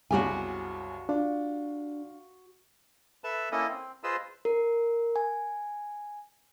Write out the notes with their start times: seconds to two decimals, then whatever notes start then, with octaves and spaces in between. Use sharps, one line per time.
0.11 C2 F#2 C#3 F#4 G4 G#5
1.09 D4 F4
3.24 A4 B4 E5 A5
3.52 A#3 C#4 E4 A4 D#5
3.68 C4
4.04 F4 G#4 B4 C5 D#5 E6
4.45 A#4
5.16 G#5